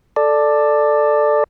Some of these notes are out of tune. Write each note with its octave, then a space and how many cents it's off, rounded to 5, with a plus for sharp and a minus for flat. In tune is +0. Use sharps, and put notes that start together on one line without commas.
A4 +0 D5 +10